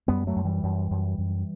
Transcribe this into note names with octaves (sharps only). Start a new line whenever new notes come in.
F#2 G3 B3
F#3 A3
F#2
E3 G3
F#2
F#2
F#2